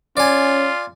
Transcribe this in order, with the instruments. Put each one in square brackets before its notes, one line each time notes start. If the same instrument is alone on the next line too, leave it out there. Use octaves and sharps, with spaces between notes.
[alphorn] C#4 [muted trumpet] F4 [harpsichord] D5 G#5